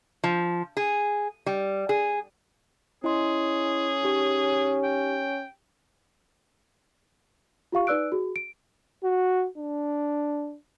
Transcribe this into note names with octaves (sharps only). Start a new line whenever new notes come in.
F3
G#4
G3
G#4
C#4 E4 G#4 D#5 C6
D#4 G4 C#5
G5
F4 G4 F5 C#6
D#4 B4 D5 E6 F#6 D7
F#4 G#4
D7
F#4
D4